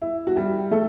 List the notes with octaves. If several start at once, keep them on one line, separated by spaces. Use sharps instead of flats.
E4
F#4
G3 G4
A3 A4